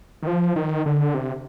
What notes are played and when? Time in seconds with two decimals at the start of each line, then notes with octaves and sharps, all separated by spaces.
0.23 D#3
0.27 F3
0.56 D#3
0.86 D3
1.14 C3